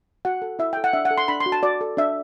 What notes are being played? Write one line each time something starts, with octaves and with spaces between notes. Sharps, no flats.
F#4 F#5
A4
E4 E5
A4 G5
F#5
D4 E5
F#5
A4
C6
D4 B5
C6
F#4
A5
F#4 D5
A4
D4 E5